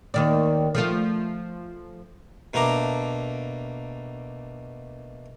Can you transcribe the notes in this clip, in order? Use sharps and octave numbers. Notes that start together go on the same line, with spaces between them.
D#2 D#3 D5
F3 A3 F4
B2 A3 A#3 D4 A#5 D6